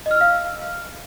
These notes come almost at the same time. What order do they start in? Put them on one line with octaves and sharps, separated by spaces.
D#5 F6 E6 F5